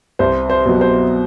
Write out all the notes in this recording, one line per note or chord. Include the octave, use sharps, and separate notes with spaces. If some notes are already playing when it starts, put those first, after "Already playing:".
C2 C5
C5
B2 F#3
C5